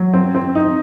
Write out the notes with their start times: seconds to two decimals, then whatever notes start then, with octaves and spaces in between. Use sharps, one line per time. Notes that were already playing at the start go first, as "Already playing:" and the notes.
Already playing: F#3
0.14 C4
0.35 C4
0.55 D#4